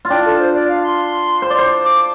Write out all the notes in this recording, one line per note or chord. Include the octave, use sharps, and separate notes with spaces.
F4
D4 G5
A4
C5
D5
F5
C6
C5
D5
C5
D6